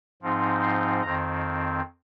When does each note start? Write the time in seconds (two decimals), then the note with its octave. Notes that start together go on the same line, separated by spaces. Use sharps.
0.22 G#2 F3 C4 D#4
0.62 C6
1.02 F2 D#3 C4 A#5